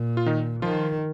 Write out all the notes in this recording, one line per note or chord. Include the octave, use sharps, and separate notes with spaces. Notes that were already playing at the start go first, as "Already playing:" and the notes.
Already playing: A#2
F4
D#3 D#4
D#3 F3 F4